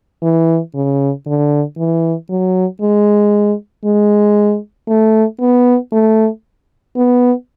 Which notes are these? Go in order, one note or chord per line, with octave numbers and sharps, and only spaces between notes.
E3
C#3
D3
E3
F#3
G#3
G#3
A3
B3
A3
B3